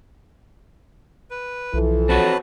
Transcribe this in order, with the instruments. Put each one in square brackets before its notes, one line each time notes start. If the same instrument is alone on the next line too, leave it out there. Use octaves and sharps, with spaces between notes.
[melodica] B4
[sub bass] B1 [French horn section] E3 F3 A4
[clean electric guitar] C4 F#4 C#5 [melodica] B4 A5 B5